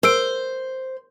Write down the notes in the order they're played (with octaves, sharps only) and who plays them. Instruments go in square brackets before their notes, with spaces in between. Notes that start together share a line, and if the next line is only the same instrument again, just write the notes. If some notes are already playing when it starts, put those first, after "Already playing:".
[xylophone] A#4 E6 D7 [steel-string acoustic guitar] C5